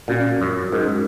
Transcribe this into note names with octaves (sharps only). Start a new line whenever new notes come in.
A#2 C#4 F#4 A#4
F#2
G#2 C#4 F#4 A#4